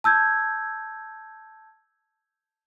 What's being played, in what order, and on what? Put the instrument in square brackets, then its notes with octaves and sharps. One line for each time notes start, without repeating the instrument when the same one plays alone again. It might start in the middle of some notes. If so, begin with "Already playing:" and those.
[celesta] A5 E6 G6 G#6